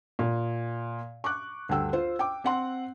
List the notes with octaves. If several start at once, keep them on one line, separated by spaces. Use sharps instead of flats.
A#2
C#6 D6 F#6
D2 G2 G5 E6
F4 C5
G5 D6
C4 F#5 C6